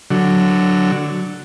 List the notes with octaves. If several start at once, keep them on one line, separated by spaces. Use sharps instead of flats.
D3 F#3